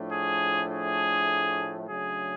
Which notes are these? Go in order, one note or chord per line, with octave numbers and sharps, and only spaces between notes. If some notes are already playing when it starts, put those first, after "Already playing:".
Already playing: A2 F3 A3 D4
G#4
G#4
C#3 F#3 A3 D4 G#4